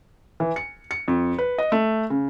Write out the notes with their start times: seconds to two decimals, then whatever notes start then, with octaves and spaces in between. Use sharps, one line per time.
0.40 E3
0.56 C#7
0.91 C#7
1.08 F2
1.38 B4
1.58 D#5
1.72 A3
2.10 C#3